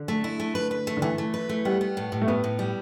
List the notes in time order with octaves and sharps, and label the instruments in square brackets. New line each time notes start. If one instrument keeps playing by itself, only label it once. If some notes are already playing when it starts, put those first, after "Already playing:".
Already playing: [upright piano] D3
[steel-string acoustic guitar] A3
E4
A3
B4
B4
A3
[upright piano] D3
[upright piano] E3 [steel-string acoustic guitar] A3
[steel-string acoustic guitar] A3
B4
A3
[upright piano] G3 [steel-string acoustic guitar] B3
[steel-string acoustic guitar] B3
A2
A2
[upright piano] A3
[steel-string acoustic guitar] A2 [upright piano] B3
[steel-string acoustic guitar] A2
G3